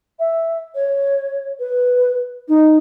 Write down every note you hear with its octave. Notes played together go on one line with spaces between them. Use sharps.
E5
C#5
B4
D#4